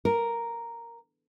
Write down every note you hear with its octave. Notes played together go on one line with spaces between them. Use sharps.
A#4